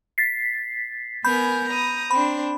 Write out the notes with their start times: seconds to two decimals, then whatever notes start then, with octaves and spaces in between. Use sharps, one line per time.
0.18 A6 B6 C7
1.24 B3 A#4 G#5 B5 G6
1.68 A#5 D#6
2.11 C4 D4 B5